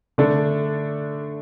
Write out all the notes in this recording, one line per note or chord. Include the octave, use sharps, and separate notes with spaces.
D3 A3 D4 A4